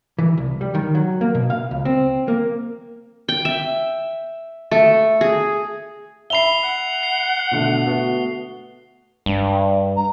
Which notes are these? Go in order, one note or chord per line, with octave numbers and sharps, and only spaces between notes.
E3
C2
G3
D#3
F#3
A#3
B2
F5
C#2
C4
A#3
G5
E5
A3
G#4
E5 B5 C7 F7 G7
F#5
C7
B2 D3 A3
A3 B3 F#4
G2
A#5